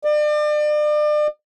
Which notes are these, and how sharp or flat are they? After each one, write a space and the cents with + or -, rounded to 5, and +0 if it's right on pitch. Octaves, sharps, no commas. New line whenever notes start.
D5 +35